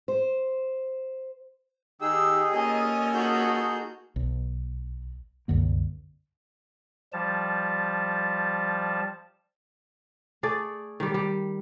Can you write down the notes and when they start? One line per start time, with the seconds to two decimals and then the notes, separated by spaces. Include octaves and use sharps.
0.08 C5
2.02 D#3 D#4 G4 G#4 E6
2.53 A#3 C#4 F4 A4 D#5 G#5
3.14 D#4 F#4 G#4 G6
4.16 B1
5.48 C2 F#2 D3 A#3
7.13 F3 G3 A5
10.43 A3 G#4 A4 D5
11.00 D#3 G3
11.14 G3